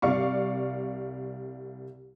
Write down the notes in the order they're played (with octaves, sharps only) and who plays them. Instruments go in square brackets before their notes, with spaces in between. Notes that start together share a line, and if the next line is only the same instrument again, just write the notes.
[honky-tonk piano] C2 D5 F5 C#6